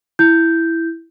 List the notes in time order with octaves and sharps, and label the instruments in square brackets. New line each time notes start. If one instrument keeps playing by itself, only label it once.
[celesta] E4 G6